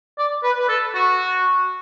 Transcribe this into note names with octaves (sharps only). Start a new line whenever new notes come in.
D5
B4
B4
A4
F#4